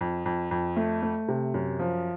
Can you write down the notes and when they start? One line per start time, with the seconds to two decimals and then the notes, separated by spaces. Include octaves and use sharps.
0.01 F2
0.26 F2
0.51 F2
0.77 A3
1.02 A3
1.28 C3
1.54 F#2
1.79 F3